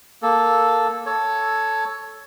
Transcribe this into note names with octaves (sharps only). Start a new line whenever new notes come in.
A#3 A4
A4 C#5